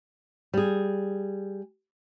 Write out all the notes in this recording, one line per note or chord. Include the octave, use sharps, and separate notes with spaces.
G3 G#4